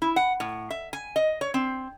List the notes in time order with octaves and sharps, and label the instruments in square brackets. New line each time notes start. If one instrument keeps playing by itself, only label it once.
[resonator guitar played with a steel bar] E4
F#5
A2
E5
G#5
D#5
C#5
C4